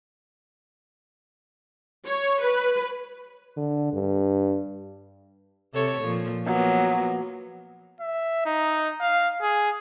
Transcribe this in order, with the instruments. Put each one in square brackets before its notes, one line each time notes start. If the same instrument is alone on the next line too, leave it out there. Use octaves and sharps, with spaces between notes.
[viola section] C#5
B4
[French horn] D3
G2
[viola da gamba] C3 A4 C#5
A#2 F3
[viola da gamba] F3 A#3 B3 [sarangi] F#3
[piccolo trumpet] E5
D#4
F5
G#4